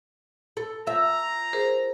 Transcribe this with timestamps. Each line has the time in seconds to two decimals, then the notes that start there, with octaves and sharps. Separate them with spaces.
0.57 A4
0.87 F3 E5 A#5
1.53 G#4 A#4 C5